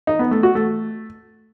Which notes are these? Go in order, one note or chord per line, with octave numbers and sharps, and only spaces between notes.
D#4
B3
A3
F#4
A3